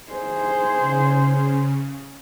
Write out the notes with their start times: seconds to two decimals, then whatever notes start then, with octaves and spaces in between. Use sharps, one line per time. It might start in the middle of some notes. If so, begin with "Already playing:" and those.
0.12 G#4 C5
0.79 C#3